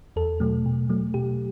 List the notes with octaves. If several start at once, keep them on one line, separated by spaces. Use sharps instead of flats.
E2 A4
B2 F#3 A3
B2
F#3 A3
B2 G4